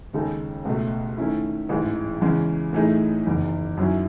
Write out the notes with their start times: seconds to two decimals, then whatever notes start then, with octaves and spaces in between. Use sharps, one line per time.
0.13 D#2 C#3 G#3 D#4 A4
0.65 C#2 B2 A3
1.17 D#3 A3 C#4 E4
1.69 A1 G#2 E3 G#3
2.21 E2 C#3 E3 G#3 C#4
2.73 A2 E3 A3 D#4 G#4
3.25 F#1 E2 D#3
3.77 F#2 D#3 F#3 C#4 E4